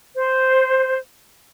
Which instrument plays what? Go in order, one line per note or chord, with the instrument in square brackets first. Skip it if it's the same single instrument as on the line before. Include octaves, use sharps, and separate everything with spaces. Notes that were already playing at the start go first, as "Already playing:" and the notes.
[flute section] C5